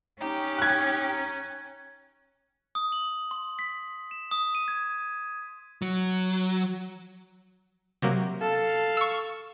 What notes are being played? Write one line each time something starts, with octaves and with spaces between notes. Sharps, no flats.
C#4 D#4 G4
F#6 G#6
D#6
F#7
C6
B6
E7
D#6
D#7
G#6
F#3
C3 F#3 A#3
A4 F5
C#6 E6